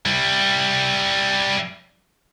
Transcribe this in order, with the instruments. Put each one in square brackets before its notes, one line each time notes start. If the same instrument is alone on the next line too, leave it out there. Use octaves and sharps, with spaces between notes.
[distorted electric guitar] G3 E4